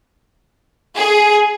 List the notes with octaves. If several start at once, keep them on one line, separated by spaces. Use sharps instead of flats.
G#4